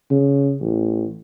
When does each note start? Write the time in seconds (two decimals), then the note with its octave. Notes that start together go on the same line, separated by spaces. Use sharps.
0.10 C#3
0.60 A1